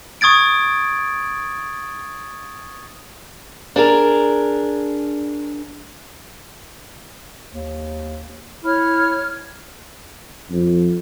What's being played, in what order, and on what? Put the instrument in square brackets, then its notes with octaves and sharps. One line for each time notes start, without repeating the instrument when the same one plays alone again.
[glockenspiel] C#6 D#6 G#6 A6 D7
[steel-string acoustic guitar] D4 G#4 A#4
[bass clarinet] D#2
[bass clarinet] E4 [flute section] C#5 F6
[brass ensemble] F2